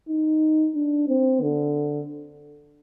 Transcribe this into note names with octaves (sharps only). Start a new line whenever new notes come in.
D#4
D4
C4
D3